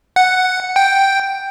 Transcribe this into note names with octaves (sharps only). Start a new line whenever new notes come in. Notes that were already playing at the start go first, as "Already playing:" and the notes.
F#5
G5